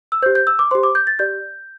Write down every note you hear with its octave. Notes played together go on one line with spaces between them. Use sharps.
E6
G4 C5 G6
G6
E6
D6
G4 C5 C6
D6
G6
A6
G4 D5 G6